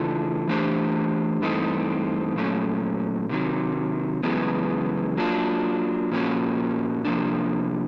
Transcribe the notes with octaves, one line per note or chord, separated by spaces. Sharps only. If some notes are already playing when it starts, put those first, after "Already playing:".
Already playing: C#3 E3 A3 D4 F4
E3 A3 D4 G4 C5
G2 E3 A3 C4 D#4
A#2 F#3 A3 C#4
C3 D#3 F#3
F#2 C#3 E3 G#3 B3
F#3 A#3 D4 F4
A#2 F3 A#3 C#4 F#4
C3 F3 A#3 D4